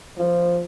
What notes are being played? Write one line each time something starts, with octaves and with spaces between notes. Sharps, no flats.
F3